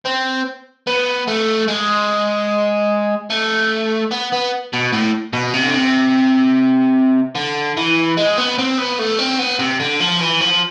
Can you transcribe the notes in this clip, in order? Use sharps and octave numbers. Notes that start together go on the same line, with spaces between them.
C4
B3
A3
G#3
A3
B3
B3
B2
A2
B2
C3
D3
C3
D3
E3
G#3
B3
C4
B3
A3
C4
B3
C3
D3
F3
E3
F3